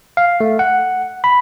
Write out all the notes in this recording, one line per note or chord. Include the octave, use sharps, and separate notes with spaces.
F5
A3
F#5
B5